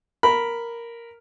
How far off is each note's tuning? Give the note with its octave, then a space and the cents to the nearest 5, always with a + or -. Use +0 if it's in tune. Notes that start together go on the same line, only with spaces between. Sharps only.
A#4 +0 B5 +0